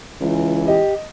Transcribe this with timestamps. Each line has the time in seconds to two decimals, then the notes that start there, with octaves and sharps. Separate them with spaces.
0.21 C#2 E3
0.68 G4 D#5